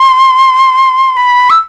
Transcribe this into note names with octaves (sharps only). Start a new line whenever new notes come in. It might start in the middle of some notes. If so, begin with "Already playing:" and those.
Already playing: C6
B5
E6